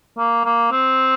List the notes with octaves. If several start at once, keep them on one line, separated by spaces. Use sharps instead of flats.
A#3
A#3
C4